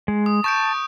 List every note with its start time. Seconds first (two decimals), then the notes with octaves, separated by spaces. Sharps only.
0.08 G#3
0.26 D#6
0.44 A5 C#6 G6 D7